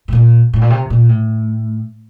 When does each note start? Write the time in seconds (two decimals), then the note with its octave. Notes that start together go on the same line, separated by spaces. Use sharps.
0.08 A2
0.12 A#2
0.53 A2
0.62 A#2
0.70 C3
0.90 A#2
1.09 A2